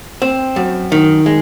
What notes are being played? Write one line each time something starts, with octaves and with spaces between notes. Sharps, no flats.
C4
F#2
D#3
G#3